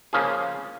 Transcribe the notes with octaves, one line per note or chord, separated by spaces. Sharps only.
C#3 F3 A#3 C#4 G#4